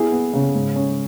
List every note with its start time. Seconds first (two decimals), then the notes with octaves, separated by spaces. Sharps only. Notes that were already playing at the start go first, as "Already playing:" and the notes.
Already playing: B3 E4 G#4
0.12 B3
0.33 C#3
0.54 G#2
0.76 C#4